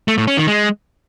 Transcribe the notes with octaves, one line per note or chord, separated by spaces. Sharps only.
A3
A2
C#4
D#3
G#3